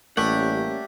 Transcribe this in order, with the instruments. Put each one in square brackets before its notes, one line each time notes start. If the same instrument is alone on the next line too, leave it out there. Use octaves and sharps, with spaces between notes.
[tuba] A1 [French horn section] G3 A#3 C#4 [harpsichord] A3 [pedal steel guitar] G4 D5 F#5